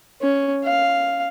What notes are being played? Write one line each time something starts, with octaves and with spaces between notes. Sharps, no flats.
C#4
F5